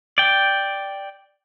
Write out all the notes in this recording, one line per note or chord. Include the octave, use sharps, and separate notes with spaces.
D5 G5